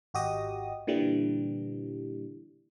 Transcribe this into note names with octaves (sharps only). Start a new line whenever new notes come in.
G#1 F#4 G4 D#5 D#6
A#2 D3 E3 G3